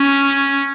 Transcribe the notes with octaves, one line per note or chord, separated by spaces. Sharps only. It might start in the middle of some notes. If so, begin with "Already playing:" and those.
Already playing: C#4